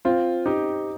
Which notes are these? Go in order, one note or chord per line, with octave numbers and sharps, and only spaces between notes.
C4 F4
D#4 G4